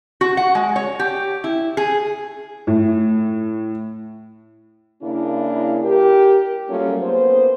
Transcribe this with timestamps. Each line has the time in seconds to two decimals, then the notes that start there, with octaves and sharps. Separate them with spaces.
0.21 F#4
0.37 F#5
0.55 G#3
0.76 C#5
0.99 G4
1.44 E4
1.77 G#4
2.67 A2
5.02 C#3 A#3 D4 E4
5.83 G4 A#4
6.69 F#3 G3 A3 A#3 C#4 F4
7.01 A#3 B3 G#4 C5